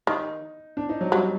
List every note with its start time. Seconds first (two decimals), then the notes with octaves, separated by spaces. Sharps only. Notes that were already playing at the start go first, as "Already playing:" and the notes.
0.07 D#3 D#4
0.77 D4
0.89 D#4
1.01 F#3
1.12 F#3 G3